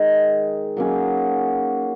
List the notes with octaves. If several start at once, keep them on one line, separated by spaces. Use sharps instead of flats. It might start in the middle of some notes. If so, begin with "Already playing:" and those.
Already playing: D#3 G#3 D#4
F#3 A#3 C#4 G#4